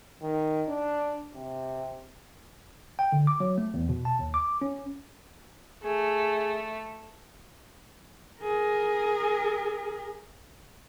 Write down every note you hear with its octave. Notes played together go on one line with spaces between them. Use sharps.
D#3
D4
C3
G5
D3
D6
F#3
A3
E2
B2
A5
D#2
D6
C#4
A3 G#4
G#4 A#4